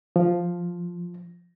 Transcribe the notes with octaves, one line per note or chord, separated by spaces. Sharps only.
F3